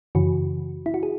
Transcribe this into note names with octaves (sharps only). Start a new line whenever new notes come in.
F#2 C#3 E3 F#4
E4
F#4
G#4